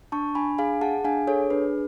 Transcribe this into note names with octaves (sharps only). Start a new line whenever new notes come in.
D4 A5 C#6
D4 G#5 B5
G#4 F5 G#5
G#4 F#5 A5
D4 F5 G#5
G#4 A4 C#5
D4 B4